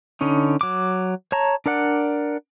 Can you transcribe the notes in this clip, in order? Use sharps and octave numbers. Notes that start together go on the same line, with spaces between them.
D3 C#4 D#4
F#3 D6
C#5 A5 A#5
D4 A#4 D5 F#5